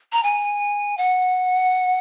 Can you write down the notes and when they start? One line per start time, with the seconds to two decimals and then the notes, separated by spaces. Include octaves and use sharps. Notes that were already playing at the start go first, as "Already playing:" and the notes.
0.13 A#5
0.23 G#5
0.98 F#5